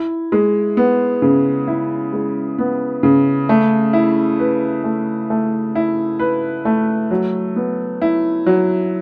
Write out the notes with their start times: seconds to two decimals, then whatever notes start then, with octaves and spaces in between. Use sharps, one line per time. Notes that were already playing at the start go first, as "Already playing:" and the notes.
Already playing: E4
0.32 G#3
0.77 B3
1.22 C#3
1.68 E4
2.13 G#3
2.58 B3
3.03 C#3
3.49 A3
3.93 E4
4.39 B4
4.84 A3
5.30 A3
5.75 E4
6.19 B4
6.65 A3
7.11 F#3
7.56 B3
8.02 E4
8.46 F#3